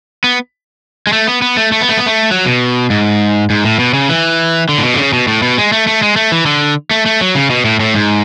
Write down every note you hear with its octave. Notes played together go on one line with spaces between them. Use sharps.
B3
G#3
A3
B3
B3
A3
A3
B3
A3
B3
A3
F#3
B2
G#2
G#2
A2
B2
C#3
E3
D3
A2
B2
D3
C#3
B2
A2
B2
G#3
A3
A3
G#3
A3
E3
D3
A3
A3
F#3
C#3
B2
A2
A2
G#2